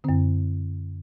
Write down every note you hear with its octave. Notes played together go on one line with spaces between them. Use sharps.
F#2 D3 C4